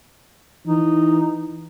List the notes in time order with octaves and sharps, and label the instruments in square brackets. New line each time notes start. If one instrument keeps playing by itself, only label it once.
[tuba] E3 [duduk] D#4